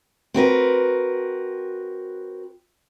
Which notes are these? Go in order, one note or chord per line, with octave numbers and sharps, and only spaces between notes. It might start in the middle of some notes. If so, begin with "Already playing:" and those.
C4 F#4 A#4 B4